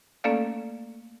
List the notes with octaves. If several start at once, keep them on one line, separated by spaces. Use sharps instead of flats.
A3 A#3 C#4 A4 D5 F5